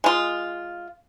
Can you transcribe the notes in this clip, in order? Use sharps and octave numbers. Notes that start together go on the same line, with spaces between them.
G#3 F4